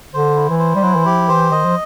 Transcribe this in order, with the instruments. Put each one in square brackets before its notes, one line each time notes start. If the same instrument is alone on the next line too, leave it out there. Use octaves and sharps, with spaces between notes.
[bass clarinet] D3 [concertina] C5
[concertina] E4
[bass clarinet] E3
[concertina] C5
[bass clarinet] G3
[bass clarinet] F#3 [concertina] E4
[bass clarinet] E3
[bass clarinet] F3 [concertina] G4
[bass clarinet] E3 [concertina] C5
[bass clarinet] D#3 [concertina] D#5
[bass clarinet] F3